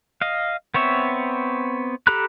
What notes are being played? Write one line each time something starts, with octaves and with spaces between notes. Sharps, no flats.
D#5 F5
B3 C4 C#5 E5
G4 A4 A#5 B5 F#6